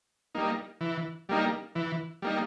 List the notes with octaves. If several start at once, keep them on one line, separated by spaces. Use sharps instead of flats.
G3 A#3 D#4
E3
G3 A#3 D#4
E3
G3 A#3 D#4